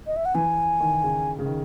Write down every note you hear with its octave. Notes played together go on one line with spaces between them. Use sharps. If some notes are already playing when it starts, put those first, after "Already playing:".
D#5
E5
F#5
E3 G#5
D#3
C#3
C#3
D#3